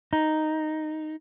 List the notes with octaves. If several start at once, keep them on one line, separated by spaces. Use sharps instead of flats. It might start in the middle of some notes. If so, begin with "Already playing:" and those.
D#4